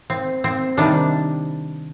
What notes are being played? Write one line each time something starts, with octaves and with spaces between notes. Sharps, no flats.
C4
C4
C3 D#3 G3 D4